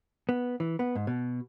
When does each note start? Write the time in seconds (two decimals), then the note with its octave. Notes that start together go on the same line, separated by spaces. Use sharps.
0.29 B3
0.60 E3
0.79 B3
0.95 G#2
1.07 B2